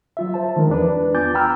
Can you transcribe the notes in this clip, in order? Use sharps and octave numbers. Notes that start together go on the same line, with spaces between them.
F#3 F4 E5
C5 A5
D#3 F3 G#3 D4 A#4
E2 D4 B4
B3 F4 G#5 D6 G6 A6
G5 A#5 B5 E6 F6 G6